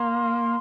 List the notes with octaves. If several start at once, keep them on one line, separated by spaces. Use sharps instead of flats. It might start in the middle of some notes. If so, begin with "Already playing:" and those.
Already playing: A#3 C6